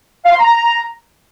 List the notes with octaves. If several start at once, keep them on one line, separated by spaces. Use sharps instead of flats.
F5
C6
A#5